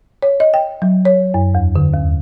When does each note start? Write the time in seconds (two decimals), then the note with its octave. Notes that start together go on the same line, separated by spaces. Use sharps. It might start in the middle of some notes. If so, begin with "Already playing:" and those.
0.23 C#5
0.40 D#5
0.54 G5
0.82 F#3
1.05 C#5
1.34 F#2
1.55 E2
1.76 D3
1.94 D#2